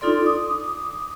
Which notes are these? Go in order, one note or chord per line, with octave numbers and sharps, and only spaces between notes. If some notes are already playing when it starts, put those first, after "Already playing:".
D4 D#4 F4 A4 D5 C6
D6 D#6